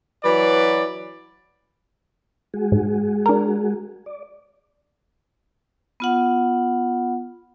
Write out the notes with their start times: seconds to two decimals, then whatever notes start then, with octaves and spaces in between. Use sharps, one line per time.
0.24 E3 F#3 B4 D5
2.54 G#3 F#4 G#4
2.72 G#2
3.26 D4 A#4
4.06 D5
6.00 B3 F4 F#5